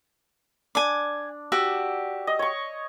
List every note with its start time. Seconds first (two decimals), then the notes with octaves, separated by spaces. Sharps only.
0.75 D4 G#5 D6
1.52 F#4 G4 F#5 E6
2.27 D#5
2.39 C#5 C#6